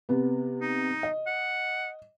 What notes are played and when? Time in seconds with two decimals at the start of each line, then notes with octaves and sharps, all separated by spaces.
0.09 C3 B3
0.62 D#4
1.03 D#5
1.27 F#5